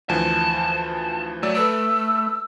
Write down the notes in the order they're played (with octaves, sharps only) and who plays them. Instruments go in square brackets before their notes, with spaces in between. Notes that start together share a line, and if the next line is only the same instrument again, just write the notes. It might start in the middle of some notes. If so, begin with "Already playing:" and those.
[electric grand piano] D2 E3 F3 [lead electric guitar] A5
[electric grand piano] F#3 D5 E6 [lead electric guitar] A3
[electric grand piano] A4 B4 D7 [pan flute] E6